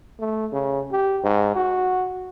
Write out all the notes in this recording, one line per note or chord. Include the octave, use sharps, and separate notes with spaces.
A3
C#3
G4
G#2
F#4